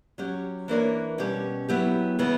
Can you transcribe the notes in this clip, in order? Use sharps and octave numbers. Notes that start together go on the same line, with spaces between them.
F#3 C#4 G4
E3 A#3 D4 A#4 C#5
B2 G3 C#4 G4
F#3 B3 E4 G4
C#3 E3 B3